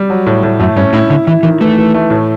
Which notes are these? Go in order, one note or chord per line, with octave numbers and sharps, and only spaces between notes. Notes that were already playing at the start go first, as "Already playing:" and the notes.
Already playing: G3
F#3
A2
A2
F#2 A3
G2 C#4
A2 E4
D3 E4
E3 E4
D#3 E3
E3 A3
E3
A3
A2